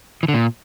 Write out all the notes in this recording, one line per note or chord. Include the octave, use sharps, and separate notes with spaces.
E3
D3
A#2